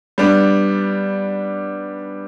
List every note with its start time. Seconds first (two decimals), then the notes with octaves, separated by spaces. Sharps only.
0.18 G3 B3 D4